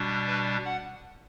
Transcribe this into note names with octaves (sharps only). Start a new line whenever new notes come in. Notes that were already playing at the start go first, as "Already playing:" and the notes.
Already playing: B2 G3 D4
B4
F#5